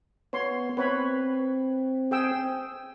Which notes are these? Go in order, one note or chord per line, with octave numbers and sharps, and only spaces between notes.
B3 C#5 C6
C4 B4 C#5 B5
G#4 G5 E6